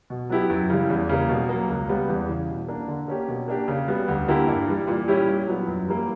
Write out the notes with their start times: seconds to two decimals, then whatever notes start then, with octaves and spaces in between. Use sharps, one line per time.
0.10 B2
0.30 F#3 B3 E4 G4
0.50 F#2
0.70 C#3 E3 G3
0.90 E2
1.09 C#3 G3 A#3
1.29 B2
1.49 F#3 A#3
1.69 C#2
1.88 C#3 G3 B3
2.09 E2
2.29 C#3 E3
2.49 B2
2.68 A#3 D4
2.88 D3
3.08 A#3 C#4 G4
3.28 B2
3.48 A#3 D4 G4
3.68 C#3
3.88 G3 B3 F#4
4.08 D2
4.28 D3 A#3 E4 G4
4.48 G2
4.67 E3 G3
4.87 A#2
5.08 G3 C#4 E4 G4
5.28 A#2
5.47 F#3 B3 E4
5.67 F#2
5.87 E3 G3 A#3 E4